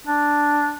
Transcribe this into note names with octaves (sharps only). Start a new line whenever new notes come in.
D4